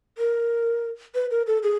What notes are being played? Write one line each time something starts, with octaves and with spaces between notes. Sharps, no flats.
A#4
B4
A#4
A4
G#4